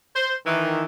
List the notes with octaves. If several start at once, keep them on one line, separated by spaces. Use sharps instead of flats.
C5
D#3 E3